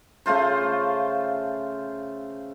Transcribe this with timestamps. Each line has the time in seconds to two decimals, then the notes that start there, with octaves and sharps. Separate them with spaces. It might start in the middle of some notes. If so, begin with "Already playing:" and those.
0.26 C#3 A3 F4 C5